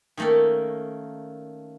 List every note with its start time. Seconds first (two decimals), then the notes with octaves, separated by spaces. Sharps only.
0.17 D#3 A3 A#3 C#4 A4